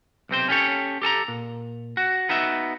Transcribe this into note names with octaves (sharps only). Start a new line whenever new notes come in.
B1 C3 C4 C5
C#4 G4 A4 C#5
G4 A4 A5 A#5
A#2
F#4
B3 D#4 F#4 E5